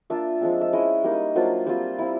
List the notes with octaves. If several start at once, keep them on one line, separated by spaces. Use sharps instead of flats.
A#3 D4 F4 E5
F3 G#3 C4
E5
G#3 C#4 E4 D#5
G3 A#3 D#4
F#3 A#3 D4 F4 C5
G3 C4 F4 C5
G3 C4 E4